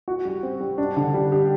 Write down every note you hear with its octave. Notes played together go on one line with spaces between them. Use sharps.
F#4
G3
C4
G3
D4
D3
G3
G4